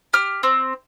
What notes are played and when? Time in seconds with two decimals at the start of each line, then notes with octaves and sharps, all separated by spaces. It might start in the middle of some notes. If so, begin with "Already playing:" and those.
0.13 G4 F6
0.43 C4